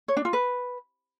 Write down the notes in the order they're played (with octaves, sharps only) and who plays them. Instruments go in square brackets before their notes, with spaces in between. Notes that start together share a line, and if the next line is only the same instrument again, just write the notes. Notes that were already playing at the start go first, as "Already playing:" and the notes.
[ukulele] C#5
D4
F4
B4